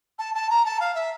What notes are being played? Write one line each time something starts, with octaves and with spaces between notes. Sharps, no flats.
A5
A5
A#5
A5
F5
E5